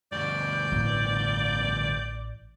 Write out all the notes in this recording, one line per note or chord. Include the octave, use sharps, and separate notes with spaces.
D2 G2 D5 G6
A1